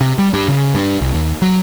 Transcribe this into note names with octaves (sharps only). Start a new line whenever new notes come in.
C3
G3
G2
C#3
G2
C2
D#2
F#3